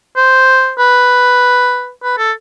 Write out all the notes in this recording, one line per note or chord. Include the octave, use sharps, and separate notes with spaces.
C5
B4
B4
A4